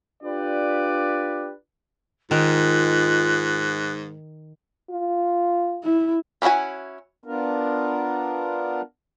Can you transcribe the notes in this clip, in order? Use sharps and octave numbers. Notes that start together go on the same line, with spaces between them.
D4 F4 G4 B4 D5
G#2 D#3 F4 F#6
F4
E4
F3 C#4 E4 F#4 G#5
B3 D4 F4 A#4